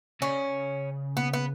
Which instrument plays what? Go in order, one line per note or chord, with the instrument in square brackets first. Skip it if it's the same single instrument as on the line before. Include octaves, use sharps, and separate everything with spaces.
[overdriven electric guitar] C#3 [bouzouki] C#4
[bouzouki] B3
B3